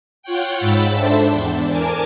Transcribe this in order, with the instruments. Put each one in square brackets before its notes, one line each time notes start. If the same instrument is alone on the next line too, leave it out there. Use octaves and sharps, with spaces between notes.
[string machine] F4 C#5 F#5 G5
G#2 B5 E6 A6
D4 A4 C5 E5
E2 D4
A#4 G#5 A5 D6